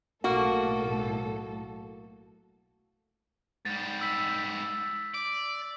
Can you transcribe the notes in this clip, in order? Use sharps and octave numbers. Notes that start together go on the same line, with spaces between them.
B1 A2 A#3 F#4 A4
G#2 G3 A6
E6 B6
D5